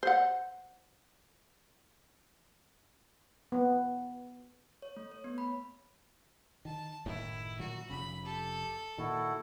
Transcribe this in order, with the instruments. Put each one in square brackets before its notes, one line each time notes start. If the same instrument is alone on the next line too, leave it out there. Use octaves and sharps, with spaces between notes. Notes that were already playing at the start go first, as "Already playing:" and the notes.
[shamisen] C5 F#5
[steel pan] B3
[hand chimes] C#5
A3
C#5
B3
B5
[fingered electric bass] D#3 [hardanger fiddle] A5
[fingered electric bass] F#1 A2 D#3 [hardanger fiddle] E4
[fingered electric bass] A#2 D#3 F#3 [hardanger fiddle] F#4
[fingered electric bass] F1 C#3 [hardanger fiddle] B5
[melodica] G4 [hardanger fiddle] A4
[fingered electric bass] A#2 D#3 [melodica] E4 F#4 A4